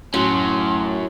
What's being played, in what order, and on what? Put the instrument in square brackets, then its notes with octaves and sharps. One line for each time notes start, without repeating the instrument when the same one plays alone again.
[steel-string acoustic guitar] A2 [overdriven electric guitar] F#3 C#4 [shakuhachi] C6